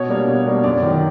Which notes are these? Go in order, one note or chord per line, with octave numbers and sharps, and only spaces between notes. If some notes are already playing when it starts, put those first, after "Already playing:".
Already playing: B2 C#5
G3 A#3 D4
B2
G3 A#3 D4
F#2 D5
D#3 F#3